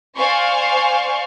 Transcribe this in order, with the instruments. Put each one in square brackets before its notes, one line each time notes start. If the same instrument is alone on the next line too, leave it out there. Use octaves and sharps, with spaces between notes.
[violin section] C5 D5 F5 G#5 C6 C#6